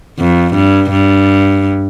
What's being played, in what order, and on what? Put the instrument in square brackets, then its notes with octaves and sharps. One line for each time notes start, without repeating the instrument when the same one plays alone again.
[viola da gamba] F2
G2
G2